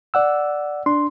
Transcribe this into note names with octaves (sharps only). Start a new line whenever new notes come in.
D5 F#5 E6
D4 C6